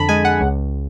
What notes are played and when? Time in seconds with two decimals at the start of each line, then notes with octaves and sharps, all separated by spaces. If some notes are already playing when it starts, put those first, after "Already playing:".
Already playing: F2 D3 A5 B5
0.09 G#3 G#5
0.25 F#5
0.41 C#2